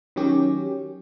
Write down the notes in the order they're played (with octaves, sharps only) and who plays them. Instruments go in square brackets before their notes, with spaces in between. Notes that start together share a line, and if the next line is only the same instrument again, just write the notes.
[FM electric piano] D#3 F#3 C#4 G4